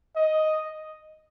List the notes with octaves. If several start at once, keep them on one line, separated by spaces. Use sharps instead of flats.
D#5